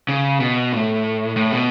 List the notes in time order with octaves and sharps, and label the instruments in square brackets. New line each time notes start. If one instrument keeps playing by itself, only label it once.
[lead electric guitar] C#3
B2
A2
A2
B2